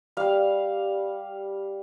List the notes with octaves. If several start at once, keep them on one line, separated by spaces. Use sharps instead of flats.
G3 F5